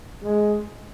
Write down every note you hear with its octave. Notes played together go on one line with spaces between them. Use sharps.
G#3